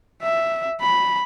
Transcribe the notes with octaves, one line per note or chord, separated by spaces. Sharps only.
E5
B5